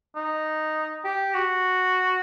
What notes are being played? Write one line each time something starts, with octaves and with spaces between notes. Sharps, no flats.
D#4
G4
F#4